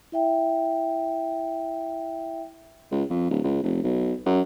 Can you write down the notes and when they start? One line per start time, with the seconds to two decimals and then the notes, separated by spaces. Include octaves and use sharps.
0.12 E4 E5 G5
2.91 C#2
3.10 F2
3.30 D1
3.44 C#2
3.63 F1
3.83 B1
4.26 F#2